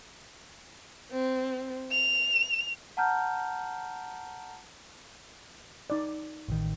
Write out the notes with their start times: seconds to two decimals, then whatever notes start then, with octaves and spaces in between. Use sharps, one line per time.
1.11 C4
1.91 F7
2.97 F#5 A5 A#5 F6 G6
5.90 D#4 D5
6.48 A1 D#3